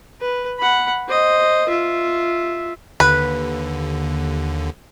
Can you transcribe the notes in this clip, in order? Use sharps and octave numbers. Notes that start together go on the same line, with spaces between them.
B4
F#5 B5
C5 D#5
F4 E5
D#2 D3 B4